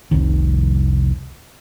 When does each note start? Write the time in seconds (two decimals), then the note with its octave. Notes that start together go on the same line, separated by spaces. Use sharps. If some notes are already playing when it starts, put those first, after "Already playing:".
0.11 F1 C2 D#3